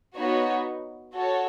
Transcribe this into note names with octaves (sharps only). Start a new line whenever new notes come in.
B3 D#4 F#4 C#5
F#4 A4 C#5